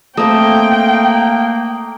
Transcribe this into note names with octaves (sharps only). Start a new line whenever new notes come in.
A3 A#3 C4 D#5 G5